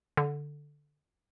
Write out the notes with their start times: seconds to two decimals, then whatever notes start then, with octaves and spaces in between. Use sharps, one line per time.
0.17 D3